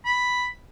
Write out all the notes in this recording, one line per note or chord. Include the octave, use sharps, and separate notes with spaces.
B5